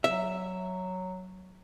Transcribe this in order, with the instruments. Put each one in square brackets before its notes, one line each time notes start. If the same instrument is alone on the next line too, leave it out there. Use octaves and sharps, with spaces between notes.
[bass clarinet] F#3 [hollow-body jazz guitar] E5